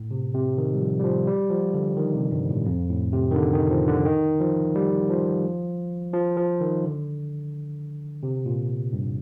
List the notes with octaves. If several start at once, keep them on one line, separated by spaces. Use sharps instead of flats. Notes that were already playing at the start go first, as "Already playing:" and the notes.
Already playing: A2
C3
C3
D#3
G3
F3
G3
F3
G3
F3
D3
D#3
C3
G2
A2
F2
A2
C3
D#3
D3
D#3
F3
D3
D#3
F3
G3
F3
F3
F3
D#3
D3
C3
A#2
G2